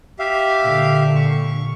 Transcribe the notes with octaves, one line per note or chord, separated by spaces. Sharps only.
G4 E5 F5
A#2 D3
C#6